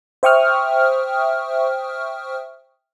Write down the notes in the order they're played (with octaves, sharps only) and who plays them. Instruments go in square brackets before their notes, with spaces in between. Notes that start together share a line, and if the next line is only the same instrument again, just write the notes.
[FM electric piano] C5 E5 G5 C#6 D#6 F6